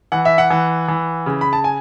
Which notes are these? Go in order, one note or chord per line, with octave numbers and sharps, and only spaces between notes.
E3 F#5
E5
F#5
E3
E3
C#3
B5
A5
G#5